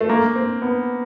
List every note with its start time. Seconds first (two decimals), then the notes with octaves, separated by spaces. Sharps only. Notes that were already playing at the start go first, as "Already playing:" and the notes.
0.01 A3
0.09 A#3
0.36 C4
0.62 B3